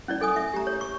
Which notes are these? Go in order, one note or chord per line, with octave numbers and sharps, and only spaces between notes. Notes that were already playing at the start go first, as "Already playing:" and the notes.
C#4 E4 D5
C#4 A4 G#5 D#6
E5
G4 A#5
C#5
C#6